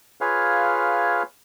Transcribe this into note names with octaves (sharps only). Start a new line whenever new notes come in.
F4 G#4 B4 C#5 F5